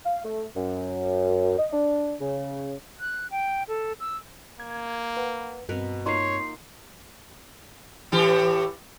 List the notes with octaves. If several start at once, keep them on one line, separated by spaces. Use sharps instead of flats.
F5
A3
F#2
D#5
D4
C#3
F#6
G5
A4
E6
A#3 G#6
B4 F#5
G2 B2 C4 A#4 B4
A#3 D#4 F4 C#5 C6 C7
A2 E3 G4